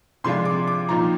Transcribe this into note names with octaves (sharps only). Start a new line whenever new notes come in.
C3 F3 G#3 D4 F4 C6
D6
D6
A#2 F3 C4 D#4 A#5